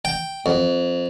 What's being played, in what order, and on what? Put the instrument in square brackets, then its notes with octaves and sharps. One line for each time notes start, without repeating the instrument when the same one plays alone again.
[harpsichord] G5
F2